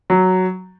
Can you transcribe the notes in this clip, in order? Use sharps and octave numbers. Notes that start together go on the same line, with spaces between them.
F#3